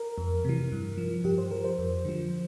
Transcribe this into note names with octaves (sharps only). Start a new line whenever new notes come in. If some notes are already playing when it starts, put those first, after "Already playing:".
Already playing: A#4
F2
C3 E3
G2
F3
G2 G4
C5
F3 A#4
C5
F2
D3 F3